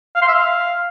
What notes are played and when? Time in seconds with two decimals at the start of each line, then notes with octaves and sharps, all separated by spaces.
0.15 F5
0.22 C6
0.28 E5
0.34 F5